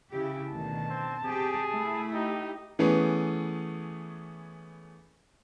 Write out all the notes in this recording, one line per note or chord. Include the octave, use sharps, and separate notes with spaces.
C#3 E4 G4
D2 B2 D#3 A5
C4
C3 G4 G#4
A3 E4
D#4 G4
E3 A3 B3 C#4 G#4